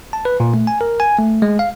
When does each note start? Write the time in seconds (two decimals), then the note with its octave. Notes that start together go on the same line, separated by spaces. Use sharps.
0.13 A5
0.25 B4
0.40 A#2
0.54 A3
0.67 G#5
0.81 A#4
1.00 G#5
1.18 A3
1.42 G#3
1.59 F5